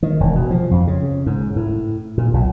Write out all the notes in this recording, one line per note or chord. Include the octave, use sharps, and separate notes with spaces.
D#3
E1
B2
F3
F2
C#3
G#2
A2
A#2
B1